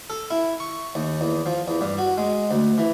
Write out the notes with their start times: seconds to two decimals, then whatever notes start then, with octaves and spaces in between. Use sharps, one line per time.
0.10 A4
0.31 E4
0.60 C#6
0.95 D#2
1.21 E2
1.46 F3
1.68 E2
1.81 G2
1.98 F#4
2.18 G#3
2.51 D2
2.78 E3